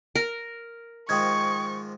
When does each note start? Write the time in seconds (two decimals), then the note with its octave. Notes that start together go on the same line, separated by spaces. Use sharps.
0.15 A#4
1.09 G#2 D#3 F3 G5 C#6 D#6 G#6